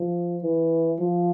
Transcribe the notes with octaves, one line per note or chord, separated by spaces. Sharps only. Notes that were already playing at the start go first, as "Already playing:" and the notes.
Already playing: F3
E3
F3